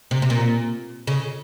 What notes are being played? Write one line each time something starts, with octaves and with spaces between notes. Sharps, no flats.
C3
C3
A#2
C#3